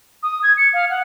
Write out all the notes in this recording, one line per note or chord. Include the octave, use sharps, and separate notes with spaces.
D#6
G#6
C#7
F5
F#5